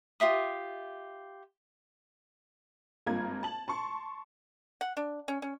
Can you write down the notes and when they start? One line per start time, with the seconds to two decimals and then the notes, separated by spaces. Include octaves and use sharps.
0.20 F4 G4 E5 D#6
3.07 G#1 G2 A#3 F4 A#5 G#6
3.43 A5 F#7
3.68 A5 C6 C#6
4.81 F#5
4.97 D4
5.28 C#4
5.42 C#4